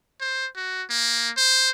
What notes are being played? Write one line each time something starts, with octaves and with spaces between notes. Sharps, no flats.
C5
F#4
A#3
C5